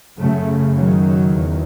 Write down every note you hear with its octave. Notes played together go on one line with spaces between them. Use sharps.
F#2 C#3 F#3 A3
D#3 F#3
E2